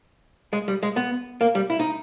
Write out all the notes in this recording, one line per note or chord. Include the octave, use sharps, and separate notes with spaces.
G#3
G3
G#3
B3
A#3
G3
E4
D#4